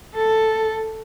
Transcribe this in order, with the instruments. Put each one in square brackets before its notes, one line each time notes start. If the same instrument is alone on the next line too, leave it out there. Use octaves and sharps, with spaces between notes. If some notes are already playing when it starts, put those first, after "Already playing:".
[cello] A4